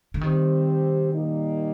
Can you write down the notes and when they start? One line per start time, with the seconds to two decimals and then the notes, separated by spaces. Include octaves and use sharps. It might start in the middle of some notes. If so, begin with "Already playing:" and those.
0.14 D3
0.21 C3 D#3 G3 C4 G4
1.12 A#2 G3 A#3 D#4